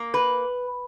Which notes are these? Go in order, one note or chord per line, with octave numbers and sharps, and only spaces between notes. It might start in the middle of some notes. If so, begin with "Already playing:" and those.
Already playing: A#3
B4